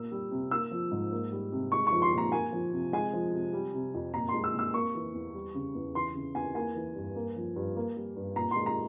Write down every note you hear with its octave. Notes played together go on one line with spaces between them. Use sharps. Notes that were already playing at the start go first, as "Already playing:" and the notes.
Already playing: A#2 A#3 E6
G3
C3
A#3 E6
F3
G#2
A#3
G3
C3
G#3 C#6
C#6
F3
C6
A#2
A#5
A#3 G#5
F3
C3
G#3 G#5
F3
C3
G3
C3
F2
A#2 A#5
C6
G#3
E6
A#2
E6
A#3 C#6
E3
E2
G3
C#3
E2
E3 C6
C#3
E2 G#5
A#3 G#5
E3
G2
A#3
F3
G2
A#3
G3
G2
A#2 A#5
G#3 C6
A#5